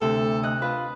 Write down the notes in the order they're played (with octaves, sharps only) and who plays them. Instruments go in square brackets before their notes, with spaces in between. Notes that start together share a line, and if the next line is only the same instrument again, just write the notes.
[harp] D2 C3 [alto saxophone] A4
[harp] D#5 F#6
[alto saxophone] F4 [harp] B4